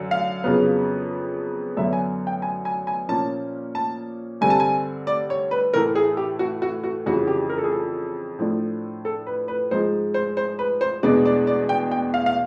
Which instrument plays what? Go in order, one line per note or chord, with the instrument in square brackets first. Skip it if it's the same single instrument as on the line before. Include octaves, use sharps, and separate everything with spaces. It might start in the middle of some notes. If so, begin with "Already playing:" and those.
Already playing: [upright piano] F#2 D3
F5
F2 C#3 F#3 B3
F#2 D3 F#3 B3 E5
G#5
G5
G#5
G#5
G#5
A#2 F3 A#3 C#4 A5
A5
G2 D3 G3 C4 G#5
A5
G#5
D5
C#5
B4
A2 E3 A3 A#4
G#4
G4
F#4
F#4
F#4
F2 C#3 E3 G3 F#4
G4
A#4
A4
G#4
A4
A2 F3 A3 D4
A4
B4
B4
G#2 F3 G#3 C5
C5
C5
B4
C5
E2 B2 G#3 B3 D4 D5
D5
D5
G5
G5
F5
F5